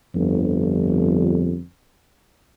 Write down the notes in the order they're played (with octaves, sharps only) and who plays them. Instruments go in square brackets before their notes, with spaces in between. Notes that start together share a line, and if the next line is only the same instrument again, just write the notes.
[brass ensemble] G1 F2